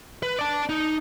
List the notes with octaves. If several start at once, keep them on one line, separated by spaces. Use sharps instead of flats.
B4
D5 A5
D#4